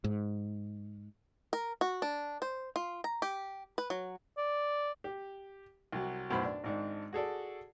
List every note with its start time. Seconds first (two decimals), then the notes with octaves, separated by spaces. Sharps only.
0.04 G#2
1.53 A#4
1.81 F#4
2.02 D4
2.42 C5
2.76 F4
3.04 A#5
3.22 G4
3.78 B4
3.90 F#3
4.38 D5
5.04 G4
5.92 C2 F#3
6.30 B1 F#2 A2 C5 B5
6.44 D4
6.64 G#1 G#2 D4
7.13 F#4 G#4 A4 D5